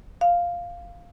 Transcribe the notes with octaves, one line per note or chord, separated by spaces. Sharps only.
F5